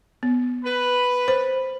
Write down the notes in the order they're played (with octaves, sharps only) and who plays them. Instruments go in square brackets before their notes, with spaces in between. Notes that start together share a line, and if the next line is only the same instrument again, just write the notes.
[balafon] B3
[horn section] B4
[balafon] C5